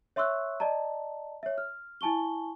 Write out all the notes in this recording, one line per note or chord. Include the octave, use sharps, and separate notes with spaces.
C#5 E5 C6 C#6 E6 F#6
D5 D#5 A5 A#5
C#5 E5
F6
E4 G#5 A5 C#6 G7